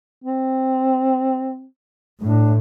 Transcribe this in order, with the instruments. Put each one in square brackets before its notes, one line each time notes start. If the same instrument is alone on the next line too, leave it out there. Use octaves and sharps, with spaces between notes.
[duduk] C4
[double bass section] A2 [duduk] D4